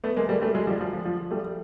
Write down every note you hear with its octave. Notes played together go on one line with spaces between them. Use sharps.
A3 B3
G#3 A#3
G3 A3
G3 A3
F#3 G#3
F3 G3
F3
F3
F3
G3 A3